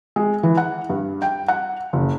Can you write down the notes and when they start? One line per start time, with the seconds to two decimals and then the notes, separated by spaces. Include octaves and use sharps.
0.16 G#3
0.43 E3
0.57 F#5
0.90 G2
1.22 G5
1.48 F#5
1.93 F#1